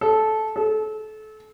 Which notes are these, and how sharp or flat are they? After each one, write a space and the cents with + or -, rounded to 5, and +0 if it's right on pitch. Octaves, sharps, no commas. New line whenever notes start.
A4 -15
A4 -30